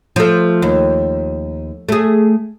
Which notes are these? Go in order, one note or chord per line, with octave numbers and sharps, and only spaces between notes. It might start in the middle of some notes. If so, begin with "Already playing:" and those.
F3 A3
D#2
A3 G#4